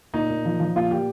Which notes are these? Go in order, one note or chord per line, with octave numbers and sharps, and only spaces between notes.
A#2 D#4
A#2
F3
F3
A#2 F4
A#2 G4